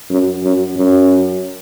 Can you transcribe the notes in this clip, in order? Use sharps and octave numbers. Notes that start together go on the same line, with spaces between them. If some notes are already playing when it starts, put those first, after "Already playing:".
F#2
F#2
F#2